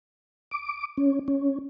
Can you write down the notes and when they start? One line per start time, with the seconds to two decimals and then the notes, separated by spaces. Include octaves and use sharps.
0.51 D6
0.97 C#4
1.28 C#4